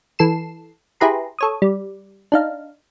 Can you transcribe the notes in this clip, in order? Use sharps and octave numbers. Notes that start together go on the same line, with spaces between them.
E3 A4 C7 E7
E4 G4 G#4 B4 A#5 C6
A4 C#5 D#6
G3
D4 D#4 F5